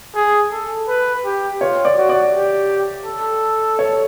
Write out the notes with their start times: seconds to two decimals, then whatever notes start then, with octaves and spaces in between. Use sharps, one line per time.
0.15 G#4
0.52 A4
0.88 B4
1.25 G4
1.61 F4 C#5
1.85 D5
1.97 F#4
2.09 D5
2.34 G4
3.06 A4
3.79 C#5